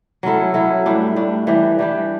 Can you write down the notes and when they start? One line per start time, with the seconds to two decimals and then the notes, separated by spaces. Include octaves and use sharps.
0.23 F#3 C#4 E4 A4
0.54 F#3 C#4 E4 A4
0.86 A2 G3 D4
1.16 A2 G3 D4
1.47 E3 G3 D4 G4
1.79 E3 G3 D4 G4